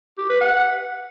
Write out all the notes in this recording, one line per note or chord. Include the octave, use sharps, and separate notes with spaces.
G4
B4
F#5